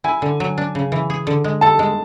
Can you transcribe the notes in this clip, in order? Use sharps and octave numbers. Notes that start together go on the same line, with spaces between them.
E4 G#5
D3
F#3
D4
C#3
E3
G#4
D3
G#3
A4 A5
G#3